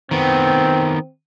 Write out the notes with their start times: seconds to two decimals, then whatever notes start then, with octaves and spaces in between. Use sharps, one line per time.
0.11 D#3 B3 C4